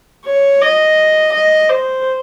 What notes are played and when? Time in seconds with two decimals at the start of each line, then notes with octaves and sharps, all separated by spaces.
0.25 C#5
0.61 D#5
1.33 D#5
1.69 C5